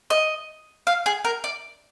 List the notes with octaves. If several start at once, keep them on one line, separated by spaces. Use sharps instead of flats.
D#5
F5
G#4
A#4
D5